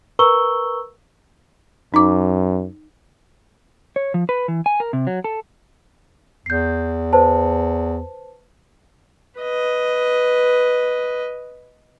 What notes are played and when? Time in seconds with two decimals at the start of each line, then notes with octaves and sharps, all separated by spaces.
0.19 A#4 B4 A#5 C#6 E6 G7
1.94 F#2 D#4 A#5 D6
3.96 C#5
4.14 F3
4.29 B4
4.48 E3
4.66 G#5
4.80 A#4
4.93 C3
5.07 F#3
5.24 A4
6.46 E2 G6 C7
7.13 B4 C5 A5
9.40 B4 D#5